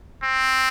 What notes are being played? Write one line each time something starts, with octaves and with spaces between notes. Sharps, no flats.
C4